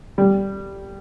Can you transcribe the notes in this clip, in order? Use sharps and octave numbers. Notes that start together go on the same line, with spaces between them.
G3